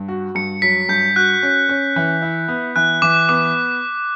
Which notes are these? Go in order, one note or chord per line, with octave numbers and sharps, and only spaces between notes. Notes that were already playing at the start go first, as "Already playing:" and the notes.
Already playing: G2
F#4
G2 C#7
F#3 B6
G2 G6
F#4 F#6
C#4
C#4
E3
E4
B3
E3 F#6
E3 D6
B3 D6